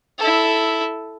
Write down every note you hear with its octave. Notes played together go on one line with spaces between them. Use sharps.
E4 A4